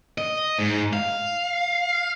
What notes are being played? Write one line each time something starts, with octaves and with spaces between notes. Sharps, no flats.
D#5
G#2
F5